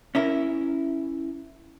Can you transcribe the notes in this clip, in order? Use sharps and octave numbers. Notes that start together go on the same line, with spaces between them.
C#4 E4 A#4